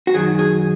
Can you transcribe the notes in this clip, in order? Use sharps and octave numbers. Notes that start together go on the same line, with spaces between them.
F#4
F#2 D#3 F#3 G#4
G#4